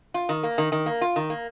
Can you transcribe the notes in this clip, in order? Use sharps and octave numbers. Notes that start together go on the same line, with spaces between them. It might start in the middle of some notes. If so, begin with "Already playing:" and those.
F4
D#3
A#3
D#3
D#3
A#3
F4
D#3
A#3